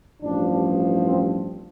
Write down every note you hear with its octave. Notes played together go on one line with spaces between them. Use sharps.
A1 G2 F3 D4
C4